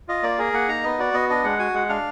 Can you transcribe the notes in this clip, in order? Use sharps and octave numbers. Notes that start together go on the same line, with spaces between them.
F4 D#5
A#3 D5
G#4 A#4
A#3 F#5
D#4 A#5
B3 D#5
F#4 D5
B3 D#5
D4 D#5
G#3 F#5
F#4 G#5
G#3 F#5
D4 F5